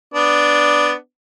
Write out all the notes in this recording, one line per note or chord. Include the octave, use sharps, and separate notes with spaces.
B3 D4